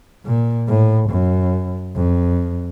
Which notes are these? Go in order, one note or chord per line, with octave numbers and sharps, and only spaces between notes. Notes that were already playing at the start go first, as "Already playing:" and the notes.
A#2
A2
F#2
F2